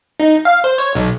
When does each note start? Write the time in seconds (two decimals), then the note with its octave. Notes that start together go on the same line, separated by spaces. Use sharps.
0.20 D#4
0.45 F5
0.64 C5
0.78 C#5
0.95 B1